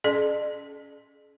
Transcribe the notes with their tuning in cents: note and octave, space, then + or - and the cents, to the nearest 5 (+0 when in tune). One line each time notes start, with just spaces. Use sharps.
C#4 +15 G#4 +40 D5 +45